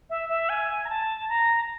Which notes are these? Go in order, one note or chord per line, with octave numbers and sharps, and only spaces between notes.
E5
E5
G#5
A#5
A5
A#5